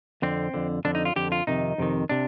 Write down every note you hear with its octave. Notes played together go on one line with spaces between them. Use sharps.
F2 D3 C4
F2 D3
F2 D3 D4
D#4
F4
F2 D3 G4
F4
F2 C3 D#3 D#4
F2 C3 D#3
C3 D4